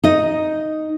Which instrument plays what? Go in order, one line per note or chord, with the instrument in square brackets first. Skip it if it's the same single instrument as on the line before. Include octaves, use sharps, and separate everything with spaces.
[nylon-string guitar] D#4 D#5